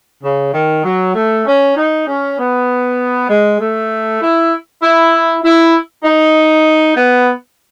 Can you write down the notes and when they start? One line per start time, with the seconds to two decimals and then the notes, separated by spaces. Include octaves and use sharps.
0.23 C#3
0.54 D#3
0.84 F#3
1.15 A3
1.46 C#4
1.76 D#4
2.07 C#4
2.38 B3
3.29 G#3
3.60 A3
4.21 E4
4.82 E4
5.44 E4
6.04 D#4
6.97 B3